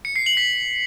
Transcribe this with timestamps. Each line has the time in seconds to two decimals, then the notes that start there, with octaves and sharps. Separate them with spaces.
0.05 C#7
0.16 C7
0.26 F#7
0.37 B6